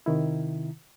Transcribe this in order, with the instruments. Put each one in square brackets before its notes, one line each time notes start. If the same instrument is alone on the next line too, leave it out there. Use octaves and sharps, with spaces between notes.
[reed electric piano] C3 D#3 E4